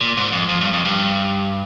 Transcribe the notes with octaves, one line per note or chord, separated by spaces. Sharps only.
A#2
G#2
F2
F2
G2
F2
G2